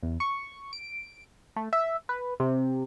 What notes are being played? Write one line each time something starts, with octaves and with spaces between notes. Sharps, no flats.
E2
C#6
D7
A3
E5
B4
C3